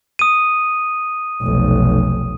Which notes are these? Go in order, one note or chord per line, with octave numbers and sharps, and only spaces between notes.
D#6 D#7
F1 B1